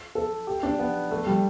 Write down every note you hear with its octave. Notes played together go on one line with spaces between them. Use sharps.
A4
G4
D4
B3
A3
G3